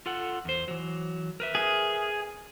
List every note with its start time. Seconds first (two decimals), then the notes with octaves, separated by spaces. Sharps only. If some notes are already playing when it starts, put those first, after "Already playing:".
0.06 F4 A4 F#5
0.45 E2 C5
0.68 E3 F#3
1.40 A#4 B4 E5
1.55 G#4